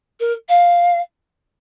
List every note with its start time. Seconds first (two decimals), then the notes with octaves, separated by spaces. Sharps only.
0.20 A#4
0.48 F5